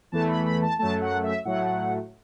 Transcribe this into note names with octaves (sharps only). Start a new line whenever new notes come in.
E2 E3 A3 A5
B5
B5
A5
F#2 F#3 A3 A5
F#5
E5
A2 F#3 A3 F#5